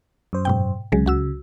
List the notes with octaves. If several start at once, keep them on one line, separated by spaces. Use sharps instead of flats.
F#2 C5
G#2 B2 G5
C2 C#3 F#3 G#3
C#2 F#4 E6